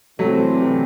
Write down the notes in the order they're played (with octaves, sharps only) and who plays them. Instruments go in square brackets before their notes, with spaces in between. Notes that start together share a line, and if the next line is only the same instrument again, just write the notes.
[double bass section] C3 E3 G3 C4 [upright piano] F#3 A3